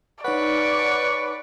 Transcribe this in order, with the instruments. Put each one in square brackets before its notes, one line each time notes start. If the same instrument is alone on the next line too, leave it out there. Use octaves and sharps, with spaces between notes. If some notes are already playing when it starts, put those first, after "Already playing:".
[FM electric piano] D#4 C#5 F#5 [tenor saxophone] B4 [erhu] D5 [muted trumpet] C#6